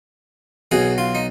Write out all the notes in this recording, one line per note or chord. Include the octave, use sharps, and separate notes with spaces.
B1 B2 F#3 G#4
F4
D#4